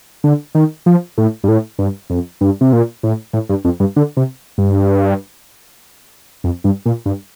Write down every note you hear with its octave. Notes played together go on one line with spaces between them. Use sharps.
D3
D#3
F3
A2
G2
A2
G2
F2
G2
C3
A#2
A2
A2
G2
F2
G2
D3
C3
G2
F2
G2
A#2
G2